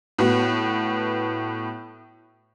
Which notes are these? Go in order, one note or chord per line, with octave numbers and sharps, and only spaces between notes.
A2 B3 F#4